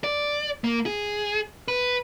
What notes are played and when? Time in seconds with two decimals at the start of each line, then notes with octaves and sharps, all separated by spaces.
0.04 D5
0.64 A#3
0.86 G#4
1.68 B4